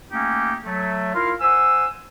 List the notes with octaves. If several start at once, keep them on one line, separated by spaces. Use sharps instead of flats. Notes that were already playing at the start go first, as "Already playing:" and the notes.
A3 A#3 C#4 D#4 G4
F#3 A3
E4 F4 A#4 F5
C5 F#5 G#5 E6